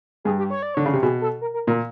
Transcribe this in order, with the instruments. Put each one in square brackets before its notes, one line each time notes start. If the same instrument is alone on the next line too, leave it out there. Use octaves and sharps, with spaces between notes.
[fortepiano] G2 [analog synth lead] G#4
[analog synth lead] G4
C#5
D5
[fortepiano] D3 [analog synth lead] C#5
[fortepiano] C#3
C3
[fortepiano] B2 [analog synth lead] G#4
[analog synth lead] A4
A#4
A#4
[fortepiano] A#2 [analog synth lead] A#4